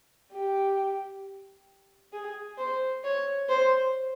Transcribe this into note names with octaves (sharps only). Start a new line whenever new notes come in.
G4
G#4
C5
C#5
C5